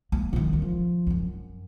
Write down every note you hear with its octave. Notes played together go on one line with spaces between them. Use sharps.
A#3
C#3
D#3
F#3
F3
F2
F#2